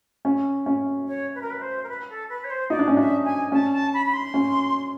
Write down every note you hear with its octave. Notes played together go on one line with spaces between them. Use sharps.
C#4
C#4
C#5
B4
A#4
B4
C5
A#4
B4
A4
B4
C#5
C5
D#4 D5
D4
C#4
D4 E5
G#5
C#4 A5
A5
B5
B5
C6
C#4